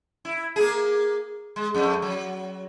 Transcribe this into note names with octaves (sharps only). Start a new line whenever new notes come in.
E4
A#3 G#4
G#3
F2 A3
F#3